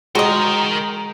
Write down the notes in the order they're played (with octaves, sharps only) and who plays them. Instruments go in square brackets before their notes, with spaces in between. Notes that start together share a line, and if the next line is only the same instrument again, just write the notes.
[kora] G#3 [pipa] F#4 D#5 [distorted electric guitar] A#4 G5 [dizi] A#5